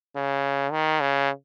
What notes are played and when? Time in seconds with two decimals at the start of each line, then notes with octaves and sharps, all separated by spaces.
0.16 C#3
0.72 D#3
1.00 C#3